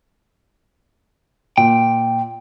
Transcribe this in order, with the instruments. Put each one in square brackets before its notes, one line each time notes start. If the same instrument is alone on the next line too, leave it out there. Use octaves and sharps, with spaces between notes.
[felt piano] A#2 [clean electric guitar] G5